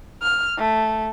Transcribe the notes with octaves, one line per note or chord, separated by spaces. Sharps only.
F6
A3